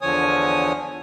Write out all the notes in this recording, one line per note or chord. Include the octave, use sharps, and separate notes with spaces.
E2 D3 F3 C#5 G#5 D#6